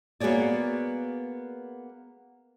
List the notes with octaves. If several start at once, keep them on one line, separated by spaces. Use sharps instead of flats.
A#3 B3 F#4 G#4 C#5 D5